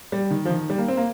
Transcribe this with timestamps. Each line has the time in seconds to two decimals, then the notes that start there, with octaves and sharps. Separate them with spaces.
0.12 G3
0.31 D#3
0.45 F3
0.50 D#3
0.70 G3
0.78 A#3
0.88 C4
0.97 A#3